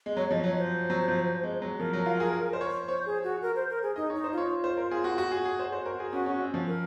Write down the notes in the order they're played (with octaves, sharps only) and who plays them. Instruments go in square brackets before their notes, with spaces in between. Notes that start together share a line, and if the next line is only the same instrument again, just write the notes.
[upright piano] G#3
[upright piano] F#3 [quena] C#5
[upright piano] F3 [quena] D#5
[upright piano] F#3 [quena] C#5
[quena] C5
[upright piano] F#3
F3
G#3
F#3
[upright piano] F3 [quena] A#4
[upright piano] F#3
F4
G#4
C5
C#5
[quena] C5 [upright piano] C#5
[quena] G#4
F#4
A#4
C5
A#4
G#4
[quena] D#4 [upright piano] D#5
[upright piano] C#5
[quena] D#4
[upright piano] C5
[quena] F4
[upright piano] C#5
C5
A#4
G#4
F#4
F#4
G#4
G#4
[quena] F#4 [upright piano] C5
[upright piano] C5
A#4
G#4
[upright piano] C#4 [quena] F#4
[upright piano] C#4
C4
F3
[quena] A#4